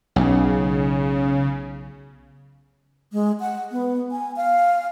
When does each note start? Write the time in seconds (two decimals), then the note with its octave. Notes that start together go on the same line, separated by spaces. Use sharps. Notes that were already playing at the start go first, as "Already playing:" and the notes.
0.16 B1 C#3
3.13 G#3
3.40 F#5
3.71 B3
4.11 G#5
4.36 F5